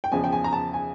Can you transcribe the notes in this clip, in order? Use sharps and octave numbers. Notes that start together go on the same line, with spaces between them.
G5
E2 C#3 F3 G#5
G5
G#5
A#5
A5
G#5